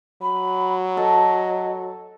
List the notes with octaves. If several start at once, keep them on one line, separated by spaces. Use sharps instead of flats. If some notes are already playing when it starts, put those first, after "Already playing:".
F#3 B5
A4 D#5